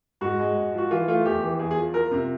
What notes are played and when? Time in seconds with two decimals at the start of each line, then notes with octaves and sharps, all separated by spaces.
0.21 G#2 F#4
0.39 G#3
0.56 G#2
0.74 F3 F#4
0.91 E3 F4
1.08 A3 F4
1.25 E2 G4
1.43 E3
1.59 E2 G#4
1.71 G#4
1.77 F3
1.94 F3 A#4
2.11 C3